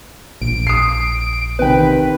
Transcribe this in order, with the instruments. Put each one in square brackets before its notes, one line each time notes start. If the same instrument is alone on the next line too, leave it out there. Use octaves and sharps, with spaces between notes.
[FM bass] A#1 [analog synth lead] D7
[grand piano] D#6 C7
[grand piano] C3 D#3 G5 [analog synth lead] B4